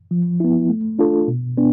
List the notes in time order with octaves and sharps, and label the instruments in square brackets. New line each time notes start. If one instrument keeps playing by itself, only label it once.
[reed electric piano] F3
B3 E4
A3
D4 F4 A4
B2
B3 D4